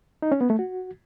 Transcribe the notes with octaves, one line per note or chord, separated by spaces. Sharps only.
D#4
C#4
B3
A3
F#4